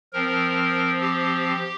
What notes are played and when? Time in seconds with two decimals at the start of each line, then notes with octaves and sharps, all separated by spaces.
0.13 F3 C4 A#4
1.01 G4